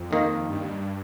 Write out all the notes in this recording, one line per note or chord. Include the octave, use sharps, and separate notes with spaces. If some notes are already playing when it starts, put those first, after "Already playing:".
Already playing: F2
D#2 D#3 A#3
G2